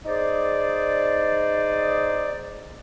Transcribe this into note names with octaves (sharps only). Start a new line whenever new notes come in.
D#4 G#4 C5 D5